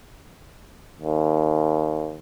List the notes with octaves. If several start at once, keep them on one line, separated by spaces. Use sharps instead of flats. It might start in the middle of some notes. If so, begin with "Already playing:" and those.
D#2